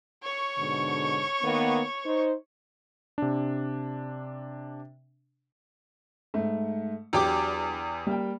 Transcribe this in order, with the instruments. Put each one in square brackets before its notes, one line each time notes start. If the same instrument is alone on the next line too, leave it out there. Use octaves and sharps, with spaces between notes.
[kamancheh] C#5 C#6
[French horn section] G#2 B2 D3
D#3 A#3 B3
D#4 C5
[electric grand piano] C3 D4
[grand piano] G#2 A3
[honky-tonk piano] E2 G4 D6 [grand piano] F#3 D4
[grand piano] G3 A#3 G5